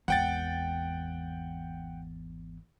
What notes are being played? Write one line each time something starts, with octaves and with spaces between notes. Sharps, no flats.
G#1 E2 F#5 G5 A6